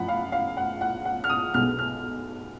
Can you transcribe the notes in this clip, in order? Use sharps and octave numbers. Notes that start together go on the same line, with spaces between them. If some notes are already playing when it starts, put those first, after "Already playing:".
Already playing: F#2 F3 F#5 B5
F5
F5
F#5
F#5
F#5
F6
D#6
B1 B2 G#3 B3 F6
F6